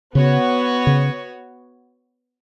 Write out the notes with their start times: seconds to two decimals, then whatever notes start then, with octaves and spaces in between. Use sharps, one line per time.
0.14 C#3 B3 F#4 C#5
0.87 C#3